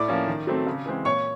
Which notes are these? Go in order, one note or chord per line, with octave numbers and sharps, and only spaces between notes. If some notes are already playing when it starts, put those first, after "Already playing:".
Already playing: A2 D5 D6
F3 A#3 C#4
D#3
F#3 A3 C4
C#3
E3 G#3 C4
A#2 C#5 C#6